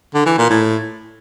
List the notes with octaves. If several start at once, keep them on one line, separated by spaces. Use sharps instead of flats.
D3
E3
A#2
A2